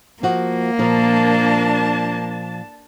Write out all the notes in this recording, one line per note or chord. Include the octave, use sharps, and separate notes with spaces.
F3 A#3 F#4
A#2 F3 D4 A#4 A5